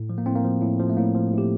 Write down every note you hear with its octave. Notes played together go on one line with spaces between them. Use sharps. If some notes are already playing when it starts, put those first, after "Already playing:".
Already playing: A2
F3
A#3
A2 C4
A#3
F3
A2
F3
A3
A2 A#3
F3
A2
G4